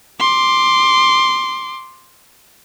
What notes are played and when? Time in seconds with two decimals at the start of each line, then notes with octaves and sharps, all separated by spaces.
0.19 C6 D6